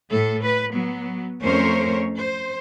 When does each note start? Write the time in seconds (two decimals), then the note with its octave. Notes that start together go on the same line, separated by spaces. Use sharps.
0.11 A2 A4
0.43 B4
0.74 F#3 B3
1.42 F2 A3 C#4 A#4 C5 C#5
2.18 C5